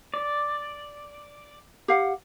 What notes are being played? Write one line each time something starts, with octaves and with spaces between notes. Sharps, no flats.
D5
G4 F5 F#5